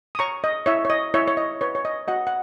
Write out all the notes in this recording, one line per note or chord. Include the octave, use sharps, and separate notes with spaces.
D#6
C#5 A#5 C#6
D#5
E4 C#5 E5
C#5
D#5
E4 C#5 E5
C#5
D#5
B4 C#5
C#5
D#5
F#4 D#5 F#5
F#5